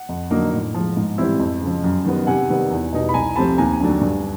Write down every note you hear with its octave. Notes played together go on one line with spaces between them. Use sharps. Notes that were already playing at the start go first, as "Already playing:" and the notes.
Already playing: F#5
F2
D3 F#3 A#3 D#4
A2
F3 G#3
G#2
E3 G3 C4 E4
F2
C#3 F3
F#2
D#3 G3 B3
C3 F#5 G#5
D#3 G3 B3
E2
B2 G3 B3 D#4
B5
C2 G#5 A#5
C3 F3 A3 C4 A5 B5
D#2 G#5 A#5
D3 F#3 A3 D4
G2